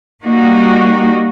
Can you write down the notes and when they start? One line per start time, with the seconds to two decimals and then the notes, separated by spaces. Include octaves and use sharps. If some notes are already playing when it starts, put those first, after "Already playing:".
0.23 G3 A#3 D#4 F#4